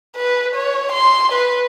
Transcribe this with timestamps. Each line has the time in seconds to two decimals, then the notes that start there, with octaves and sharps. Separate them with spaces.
0.16 B4
0.55 C#5
0.92 C6
1.32 B4